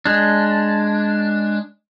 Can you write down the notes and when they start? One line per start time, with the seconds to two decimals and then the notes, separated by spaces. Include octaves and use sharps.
0.05 G#3 D4